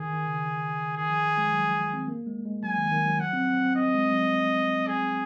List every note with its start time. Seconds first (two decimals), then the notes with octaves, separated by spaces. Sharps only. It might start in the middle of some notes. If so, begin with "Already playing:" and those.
Already playing: D#3 G#4
0.13 D#3
0.27 C#3
0.97 D#3 G#4
1.10 F3
1.38 G#3
1.53 F#3
1.66 F3
1.93 C4
2.08 A#3
2.26 G#3
2.45 G#3
2.64 F#3 G#5
2.78 D#3
2.91 D#3
3.05 F#3
3.19 F#3 F#5
3.33 C4
3.47 C4
3.61 C4
3.75 C4 D#5
3.95 G#3
4.13 F#3
4.87 G#4